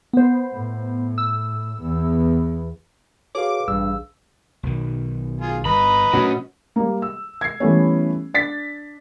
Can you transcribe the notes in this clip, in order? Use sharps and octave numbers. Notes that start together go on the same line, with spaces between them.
B3 C5
A2
E6
E2 B3
F#4 G#4 A4 B4 C#5 F5 D6
A1 G2 E6
B1 B2 D#3
F4 G#4
G1 B4 D#5 A#5 B5
A#2 A3 C#4 D4 F#4
G3 A#3
E6
G#6 C7
E3 G3 A3 B3 C#4
D4 A6 B6